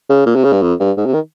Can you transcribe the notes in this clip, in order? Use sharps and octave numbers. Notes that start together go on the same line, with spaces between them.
C#3
A#2
C3
C#3
G2
F2
G2
G#2
C3
D#3